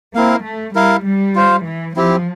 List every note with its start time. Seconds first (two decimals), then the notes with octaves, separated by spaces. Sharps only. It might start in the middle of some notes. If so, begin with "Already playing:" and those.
0.15 A#3 C4 E4 A#4 F5
0.45 A3
0.75 G3 E4 A#4 F5
1.05 G3
1.36 F4 C5 F5
1.66 E3
1.95 F3 C4 E4 G4